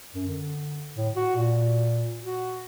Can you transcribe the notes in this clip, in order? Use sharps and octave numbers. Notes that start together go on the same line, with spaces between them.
F#2
D3
A2
F#4
A#2
F#4